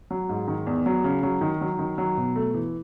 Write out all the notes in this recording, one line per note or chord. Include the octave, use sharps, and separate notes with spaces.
F#3
G#2
D#3
E2
F#3
C#3
F#3
D#3
F#3
D#3
F#3
B2
A3
E3